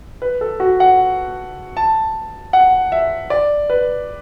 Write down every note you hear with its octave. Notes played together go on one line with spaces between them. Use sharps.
B4
A4
F#4
F#5
A5
F#5
E5
D5
B4